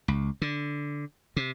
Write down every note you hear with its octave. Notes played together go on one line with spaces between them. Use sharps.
C#2
D3
C3